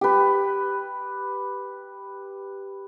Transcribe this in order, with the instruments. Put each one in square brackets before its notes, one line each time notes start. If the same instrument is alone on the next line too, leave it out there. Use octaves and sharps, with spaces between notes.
[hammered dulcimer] G4 B4